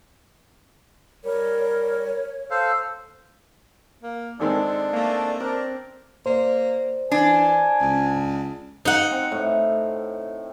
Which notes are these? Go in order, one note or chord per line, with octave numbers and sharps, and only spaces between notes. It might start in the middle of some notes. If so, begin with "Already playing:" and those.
G3 A#4 C#5
A4 C5 F5
A#3
G#1 D#3 G#3 C4 D4 A4 D5
A3 A#3
C4 D4 A#4
A#3 C5 D5
E3 D4 G#5
C#2
D#4 F#5
C4
A2